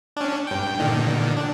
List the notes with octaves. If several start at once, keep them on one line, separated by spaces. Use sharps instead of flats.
C#4 D4
G2 G5
A#2 D3 D#3
D4